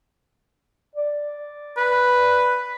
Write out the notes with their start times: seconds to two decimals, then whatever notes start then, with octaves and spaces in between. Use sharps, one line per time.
0.96 D5
1.77 B4